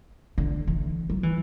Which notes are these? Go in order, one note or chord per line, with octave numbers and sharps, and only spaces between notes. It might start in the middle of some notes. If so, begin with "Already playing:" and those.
D3
E3
F#3
E3